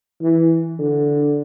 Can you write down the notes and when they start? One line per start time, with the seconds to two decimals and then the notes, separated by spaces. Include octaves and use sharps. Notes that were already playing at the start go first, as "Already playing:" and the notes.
0.22 E3
0.79 D3